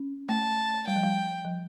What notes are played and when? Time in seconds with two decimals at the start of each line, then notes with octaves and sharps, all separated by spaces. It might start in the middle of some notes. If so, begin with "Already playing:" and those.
Already playing: C#4
0.29 A3 A5
0.88 G3 G5
0.96 F3
1.03 G3
1.45 F3